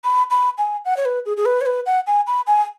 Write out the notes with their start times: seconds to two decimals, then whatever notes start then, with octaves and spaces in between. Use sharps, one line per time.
0.04 B5
0.31 B5
0.58 G#5
0.85 F#5
0.97 C#5
1.05 B4
1.26 G#4
1.37 G#4
1.45 B4
1.61 C#5
1.66 B4
1.86 F#5
2.07 G#5
2.27 B5
2.47 G#5